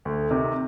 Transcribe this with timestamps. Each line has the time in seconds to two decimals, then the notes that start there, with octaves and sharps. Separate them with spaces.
0.05 D2
0.31 C3 D#3